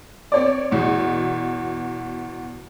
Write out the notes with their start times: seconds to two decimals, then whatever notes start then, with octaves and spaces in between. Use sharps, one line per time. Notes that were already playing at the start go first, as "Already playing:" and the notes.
0.32 C4 C#5 D5
0.72 E2 B2